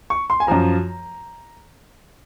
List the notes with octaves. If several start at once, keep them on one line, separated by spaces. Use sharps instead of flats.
C#6
C6
G#5
F#2 F3 A#5